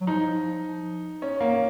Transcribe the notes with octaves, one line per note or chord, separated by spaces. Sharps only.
F#3
F3 D#4
C#4
A#3